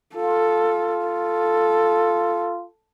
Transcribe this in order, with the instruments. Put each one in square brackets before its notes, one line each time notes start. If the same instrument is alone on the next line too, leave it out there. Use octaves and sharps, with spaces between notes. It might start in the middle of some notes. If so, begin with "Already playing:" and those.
[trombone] F4 [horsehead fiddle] A4
[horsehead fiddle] A4